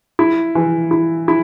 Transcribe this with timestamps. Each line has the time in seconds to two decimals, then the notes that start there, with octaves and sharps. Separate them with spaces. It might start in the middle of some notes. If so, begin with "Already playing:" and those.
0.19 E4
0.55 E3
0.91 E4
1.28 E4